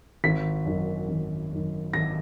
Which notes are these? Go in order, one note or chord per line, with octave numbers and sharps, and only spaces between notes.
G#1 B6
F#2 D#3
G#1
F#2 D#3
G#1 A#6